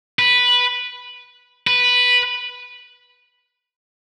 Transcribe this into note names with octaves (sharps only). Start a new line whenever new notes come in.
B4
B4